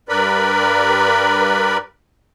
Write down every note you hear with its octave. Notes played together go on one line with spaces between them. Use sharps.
G2 A#4 B4 D5 B5